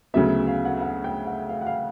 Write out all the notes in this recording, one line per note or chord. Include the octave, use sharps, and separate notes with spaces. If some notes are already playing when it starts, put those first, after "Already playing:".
D2 C#3 F#3 B3 E5
F5
F#5
F#5
G5
F#5
F5
F#5
F5